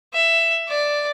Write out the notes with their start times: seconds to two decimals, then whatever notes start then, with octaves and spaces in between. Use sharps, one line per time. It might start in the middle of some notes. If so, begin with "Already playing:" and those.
0.14 E5
0.68 D5